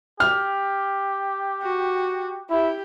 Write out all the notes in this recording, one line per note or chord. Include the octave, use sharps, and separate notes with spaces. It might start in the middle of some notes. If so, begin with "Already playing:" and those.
G4 F6
F#4
E4 G4